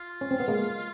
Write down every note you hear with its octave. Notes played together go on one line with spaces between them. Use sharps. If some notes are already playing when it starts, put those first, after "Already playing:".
Already playing: F4
C#4
C4
B3
G#3 A#3